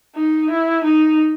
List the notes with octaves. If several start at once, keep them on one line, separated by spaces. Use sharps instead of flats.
D#4
E4
D#4